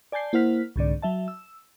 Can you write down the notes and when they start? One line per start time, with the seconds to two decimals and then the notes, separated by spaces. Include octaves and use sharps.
0.12 D5 G#5 A5 G6 C7
0.33 A#3 E4 C5 F#5 F6 B6
0.76 C2 G#2 D3 D5
1.02 F#3 E5 A5
1.28 E6